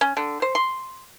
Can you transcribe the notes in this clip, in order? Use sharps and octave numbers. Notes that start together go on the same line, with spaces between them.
C#4
D3
C5
C6